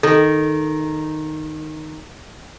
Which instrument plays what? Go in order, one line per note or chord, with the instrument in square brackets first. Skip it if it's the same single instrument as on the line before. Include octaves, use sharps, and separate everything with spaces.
[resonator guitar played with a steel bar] D#3 [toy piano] A4